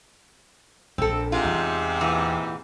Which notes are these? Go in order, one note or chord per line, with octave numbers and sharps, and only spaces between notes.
A#1 C4 A4
G#2 C3 F4
E2
A#2 E3